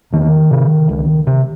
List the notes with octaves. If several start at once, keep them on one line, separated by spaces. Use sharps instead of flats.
E2 D#3
C3
C#2
C3